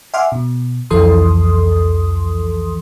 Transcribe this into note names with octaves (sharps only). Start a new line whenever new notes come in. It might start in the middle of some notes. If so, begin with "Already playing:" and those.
E5 F#5 G#5 C6 D6 F6
B2
C2 F2 E3 A4 C6 D#6